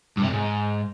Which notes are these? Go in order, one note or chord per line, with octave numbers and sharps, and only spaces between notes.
G2
C3
F2
G#2